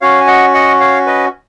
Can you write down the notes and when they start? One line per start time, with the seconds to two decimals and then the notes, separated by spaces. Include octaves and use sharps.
0.01 C#4 F#4 C#5 F5
0.20 G#5
0.27 D#5 F#5
0.54 D#5 F#5
0.80 C#5 F5
1.06 B4 D#5